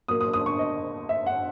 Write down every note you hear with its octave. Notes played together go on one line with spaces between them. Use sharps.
A#2 F#3 A#3 D#6
D#6
D#6
C#6
D#5
E5
F#5